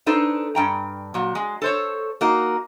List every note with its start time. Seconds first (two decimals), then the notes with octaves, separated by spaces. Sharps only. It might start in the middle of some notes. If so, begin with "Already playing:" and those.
0.06 D4 D#4 A4 B4 C5
0.55 G2 G5 A#5
1.14 A#2 F#3
1.35 G#3
1.62 A4 C5 C#5
2.21 A#3 D#4 F#4 A#4